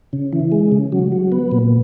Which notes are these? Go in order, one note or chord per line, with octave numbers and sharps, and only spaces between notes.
C#3
E3
G#3
C#3
F#3
F#3
B3
A#2